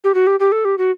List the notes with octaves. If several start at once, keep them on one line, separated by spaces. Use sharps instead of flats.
G4
F#4
G4
G4
A4
G4
F#4